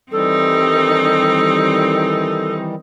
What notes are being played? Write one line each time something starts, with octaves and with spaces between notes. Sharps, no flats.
D#3 E3 G3 C4 D#4 A4